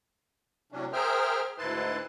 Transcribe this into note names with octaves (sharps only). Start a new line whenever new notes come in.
A2 C3 F#3 C#4 D4
G#4 A#4 C5 E5 G5 F6
D2 G#2 E4 B4 A5 C6